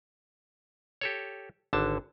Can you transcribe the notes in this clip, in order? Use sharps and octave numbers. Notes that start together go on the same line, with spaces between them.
G4 A4 C#5
G#1 D3 A5